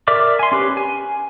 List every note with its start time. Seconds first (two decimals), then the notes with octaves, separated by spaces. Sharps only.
0.08 A#4 D5 E5 D6
0.39 G#5 C6
0.52 C#4 G4 B4
0.77 G#5